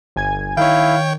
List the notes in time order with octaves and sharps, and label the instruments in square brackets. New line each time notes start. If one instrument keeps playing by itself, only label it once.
[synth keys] G1 G#5 G#6
[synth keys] D#3 [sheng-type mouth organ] E4 [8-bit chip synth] C#5 G5 [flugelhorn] F5